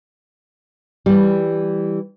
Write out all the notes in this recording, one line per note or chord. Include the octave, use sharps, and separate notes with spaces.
E3 G3